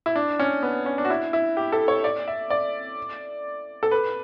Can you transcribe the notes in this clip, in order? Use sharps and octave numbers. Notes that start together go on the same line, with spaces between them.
E4
D4
C#4
B3
C#4
D4
F#4
E4
E4
G4
A4
C#5
D5
E5
D5
A4
B4